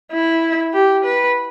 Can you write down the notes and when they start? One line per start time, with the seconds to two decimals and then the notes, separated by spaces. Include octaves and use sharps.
0.12 E4
0.74 G4
1.05 B4